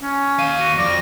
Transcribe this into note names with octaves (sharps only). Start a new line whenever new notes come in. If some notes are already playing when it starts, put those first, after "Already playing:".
C#4
D#2 F5 D#7
F#4
F2 D5 A#6